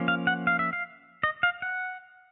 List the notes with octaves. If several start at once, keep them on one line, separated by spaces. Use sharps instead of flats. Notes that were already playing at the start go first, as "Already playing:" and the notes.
Already playing: F3 A#3 C#4
F5
F#5
F5
E5
F5
D#5
F5
F#5